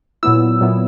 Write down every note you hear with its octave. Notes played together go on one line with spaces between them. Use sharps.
A#2 F#3 B3 E4 E6
A#2 F#3 B3 E4